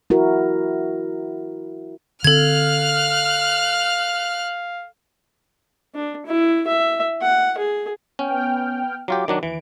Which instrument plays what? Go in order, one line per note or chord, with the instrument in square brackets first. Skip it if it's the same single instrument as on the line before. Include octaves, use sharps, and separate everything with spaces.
[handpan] E4 F#4 A#4
[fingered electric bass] D3 C4 [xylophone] A4 G#6 [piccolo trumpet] F5 [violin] F6 F#6
[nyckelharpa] D4
E4
E5
F#5
G#4
[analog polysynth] B3 G5 F6 [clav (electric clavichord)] C#4
[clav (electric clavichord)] F#3 F4 G4 [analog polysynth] D6
[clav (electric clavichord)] D#3 F#3 D4
[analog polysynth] D#2 D7 [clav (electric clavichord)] E3